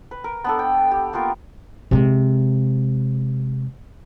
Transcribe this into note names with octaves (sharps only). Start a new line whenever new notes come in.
B4
A#4
B3 D4 A4
G5
G4
A#3 B3 F4 A#4
C3 G#3